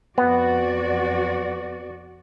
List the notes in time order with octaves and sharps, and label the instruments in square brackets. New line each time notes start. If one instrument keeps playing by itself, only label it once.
[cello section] F2 F#4 D5 [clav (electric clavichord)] B3